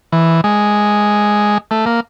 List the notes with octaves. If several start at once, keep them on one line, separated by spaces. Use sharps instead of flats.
E3
G#3
A3
A#3